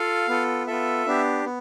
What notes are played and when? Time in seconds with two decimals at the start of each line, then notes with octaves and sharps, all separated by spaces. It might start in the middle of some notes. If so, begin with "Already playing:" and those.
Already playing: F4 A4 F5
0.28 B3 F4 A4
0.67 B3 F4 A4 E5
1.06 B3 D4 G4
1.45 B3